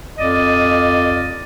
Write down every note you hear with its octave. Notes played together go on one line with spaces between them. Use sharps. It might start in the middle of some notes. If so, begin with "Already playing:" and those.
F2 F4 D5 D#5